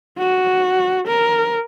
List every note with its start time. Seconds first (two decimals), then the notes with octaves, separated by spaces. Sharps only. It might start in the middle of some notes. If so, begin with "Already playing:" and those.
0.18 F#4
1.08 A#4